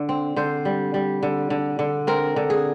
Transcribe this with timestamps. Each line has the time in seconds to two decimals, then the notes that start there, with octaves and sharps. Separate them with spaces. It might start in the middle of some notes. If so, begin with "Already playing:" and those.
Already playing: D3
0.09 C4
0.36 D3 C5
0.65 G3
0.94 G3
1.23 D3
1.50 D3
1.79 D3
2.07 C4 A#4
2.36 D3
2.50 G#4